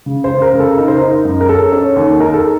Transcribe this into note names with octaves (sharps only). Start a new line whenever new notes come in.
C#3
C5
C#3
A#4
C#3
A4
D#4 A#4
C5
D#4 A#4
F#2
A#4
C#4 A4
C#4
D#2
D#4 A#4
A4